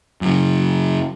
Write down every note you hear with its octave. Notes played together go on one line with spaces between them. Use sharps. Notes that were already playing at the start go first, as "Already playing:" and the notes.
F#2 C#3